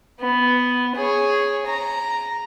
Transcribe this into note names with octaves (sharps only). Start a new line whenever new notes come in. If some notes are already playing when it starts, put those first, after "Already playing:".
B3
G#4 C#5
A#5